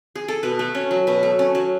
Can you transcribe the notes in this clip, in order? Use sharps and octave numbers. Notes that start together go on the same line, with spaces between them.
G#4
A4
B2 B4
A3
C#4
F#3
B2 B4
A3
C#4
F#3